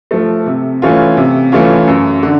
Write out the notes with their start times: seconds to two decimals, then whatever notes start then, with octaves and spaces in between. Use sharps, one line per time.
0.11 F3 A3
0.46 C3
0.82 E3 A3 C#4 F4
1.17 C3
1.52 E3 A3 C#4 F4
1.87 F#2
2.23 D3